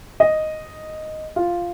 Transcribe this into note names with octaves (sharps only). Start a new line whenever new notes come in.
D#5
F4